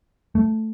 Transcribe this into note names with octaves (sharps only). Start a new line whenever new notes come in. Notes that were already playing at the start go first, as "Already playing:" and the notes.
A3